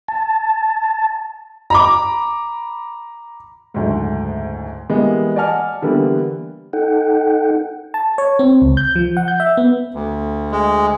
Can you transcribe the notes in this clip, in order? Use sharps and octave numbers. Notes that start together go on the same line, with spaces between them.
A5
A#5 B5 D6
F#1 D2 G#2
E3 G3 G#3 A#3 B3
D5 D#5 F#5 G#5 A5 F6
D3 E3 G3 A#3 B3
D#4 A4 F#5 G5
A5
C#5
C4
C#2
G6
F3
F#5
G6
E5
B3
D2
G#3